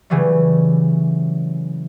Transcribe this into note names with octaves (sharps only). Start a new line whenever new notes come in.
C#3 E3 F#3 G3 A3